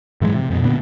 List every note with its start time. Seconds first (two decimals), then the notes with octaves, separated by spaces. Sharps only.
0.21 G#2 E3 F#3 G#3
0.35 C3
0.50 F2 B2
0.62 A#2 D3 B3